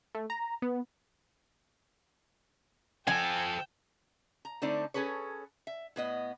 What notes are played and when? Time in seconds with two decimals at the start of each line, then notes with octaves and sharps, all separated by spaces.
0.15 A3
0.30 A#5
0.62 B3
3.07 F3 A4 G5 G#5
4.45 A#5
4.62 D3 A3 C4 D4 D#4 D5
4.94 C#4 G#4 A4 B4 C#5
5.67 E5
5.96 A2 B3 D#5